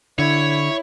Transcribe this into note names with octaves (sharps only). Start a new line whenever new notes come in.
D3 E4 C#5